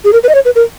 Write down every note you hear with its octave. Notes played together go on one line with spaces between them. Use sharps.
G#4
A#4
B4
D#5
C#5
B4
A#4